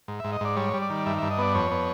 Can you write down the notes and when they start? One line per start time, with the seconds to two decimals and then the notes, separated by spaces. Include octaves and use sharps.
0.08 G#2
0.20 G#2 E5
0.32 D#5
0.41 G#2 D5
0.56 G3 C#5
0.73 G3
0.82 D5
0.90 D#3
1.06 G2 E5
1.18 G2 E5
1.31 D#5
1.38 B3 D5
1.55 F2 C#5
1.71 B3